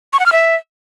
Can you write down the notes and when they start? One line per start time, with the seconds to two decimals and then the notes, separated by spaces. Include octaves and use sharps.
0.13 C#6
0.20 F#5
0.26 F6
0.32 E5